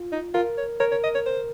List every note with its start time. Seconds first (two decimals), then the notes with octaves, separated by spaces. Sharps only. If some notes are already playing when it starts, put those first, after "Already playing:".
Already playing: F4
0.12 D#4
0.34 F4 A#4
0.57 C#5
0.80 A#4 C#5
0.91 C#5
1.03 D#5
1.14 C#5
1.26 C5